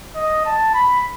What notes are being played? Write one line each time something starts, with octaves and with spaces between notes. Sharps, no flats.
D#5
A5
B5